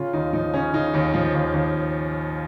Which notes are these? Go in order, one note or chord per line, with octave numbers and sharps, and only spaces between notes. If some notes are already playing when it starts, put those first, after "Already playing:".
Already playing: C#3 F4
D#2 D#4
F3 D#4
C#3 C#4
C#3 D#4
D#2
F3
D#2
D#2